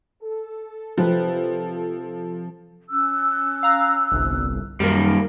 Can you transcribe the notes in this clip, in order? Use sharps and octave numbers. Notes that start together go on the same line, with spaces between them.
A4
C3 F3 B4
C#4 E6 F#6
F5 A#5
G1 C2
F#2 D#3 G3 A#3 A#4